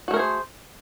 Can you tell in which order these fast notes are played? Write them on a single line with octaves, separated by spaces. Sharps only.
F#4 A3 A#4 G#4 C5